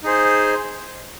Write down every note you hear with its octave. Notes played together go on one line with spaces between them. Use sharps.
D#4 G#4 C5